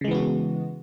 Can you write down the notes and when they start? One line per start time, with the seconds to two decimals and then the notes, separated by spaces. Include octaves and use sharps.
0.01 C#3
0.04 G#3
0.08 E3
0.11 B3
0.14 F#4